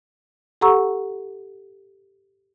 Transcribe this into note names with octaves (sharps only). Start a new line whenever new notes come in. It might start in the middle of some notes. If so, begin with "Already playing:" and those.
G4 A4 F#5 A#5 C#6 E6